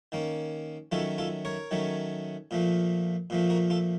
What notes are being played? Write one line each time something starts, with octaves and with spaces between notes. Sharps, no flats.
D#3 A#3 C#4
D#3 F#3 A3 C#4 F4 A4
F4 A4
A#4 C#5
D#3 F#3 A3 C#4
A#2 F3 A3
A#2 F3 A3
F#4 A#4
F4 A4